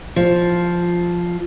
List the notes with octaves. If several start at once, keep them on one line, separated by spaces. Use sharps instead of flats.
F3